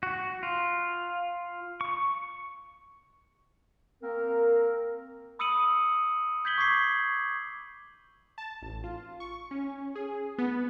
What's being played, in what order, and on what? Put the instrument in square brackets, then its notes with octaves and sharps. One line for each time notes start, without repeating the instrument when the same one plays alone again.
[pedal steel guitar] F#4
F4
C#6
[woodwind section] A#3 C4 A#4
[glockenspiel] B5 D#6 E6 C#7 D#7 F#7
G6 G#6 B6 F#7 G7
C#6 D6 G#6 B6 C7
[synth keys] A5
A1
F4
C#6
C#4
G#4
B3